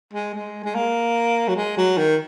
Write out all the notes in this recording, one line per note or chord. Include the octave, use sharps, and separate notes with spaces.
G#3
G#3
G#3
A#3
F#3
G#3
F#3
D#3